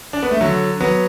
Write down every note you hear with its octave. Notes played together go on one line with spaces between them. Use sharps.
D4
B3
A3
D3 F#3
F#3 B3